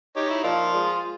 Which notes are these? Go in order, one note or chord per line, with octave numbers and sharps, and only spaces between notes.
D#4 G4 C#5
E4
A#2 F3 F4
G#3